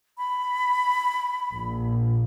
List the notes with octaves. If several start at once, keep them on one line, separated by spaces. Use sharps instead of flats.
B5
A#1